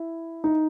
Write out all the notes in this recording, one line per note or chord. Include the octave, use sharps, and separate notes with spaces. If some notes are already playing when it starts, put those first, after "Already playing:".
Already playing: E4
D#4